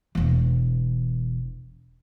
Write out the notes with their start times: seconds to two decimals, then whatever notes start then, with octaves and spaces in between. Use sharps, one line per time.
0.15 E1 E3